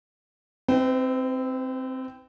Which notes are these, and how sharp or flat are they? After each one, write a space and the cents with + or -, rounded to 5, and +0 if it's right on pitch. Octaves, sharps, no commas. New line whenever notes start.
C4 +0 D#4 +30 C5 -45